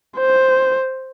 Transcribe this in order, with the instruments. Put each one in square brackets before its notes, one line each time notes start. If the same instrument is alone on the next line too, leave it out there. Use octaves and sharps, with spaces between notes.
[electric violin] C5